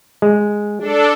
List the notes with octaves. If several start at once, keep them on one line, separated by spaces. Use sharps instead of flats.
G#3
D4 A4